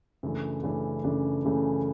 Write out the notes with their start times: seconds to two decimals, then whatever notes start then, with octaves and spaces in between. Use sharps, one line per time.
0.23 F#2 C#3 E3 A3 D4
0.63 F#2 C#3 E3 A3 D4
1.04 F#2 C#3 E3 A3 D4
1.45 F#2 C#3 E3 A3 D4